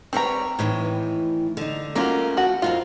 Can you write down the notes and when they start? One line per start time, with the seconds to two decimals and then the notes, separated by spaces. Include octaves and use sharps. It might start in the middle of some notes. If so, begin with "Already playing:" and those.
0.13 G3 C4 B4 C#5 A#5
0.59 A2 D#3 E3
1.57 D3 D#4
1.95 A3 A#3 C#4 F4 F#4 A#4
2.37 F3 F#4
2.62 F2 G#2 D#4 F4